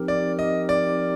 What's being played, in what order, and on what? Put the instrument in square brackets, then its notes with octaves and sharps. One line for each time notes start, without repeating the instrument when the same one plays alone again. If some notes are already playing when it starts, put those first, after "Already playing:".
Already playing: [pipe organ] F3 C4 D#4 G4 A#4
[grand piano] D5
D#5
D5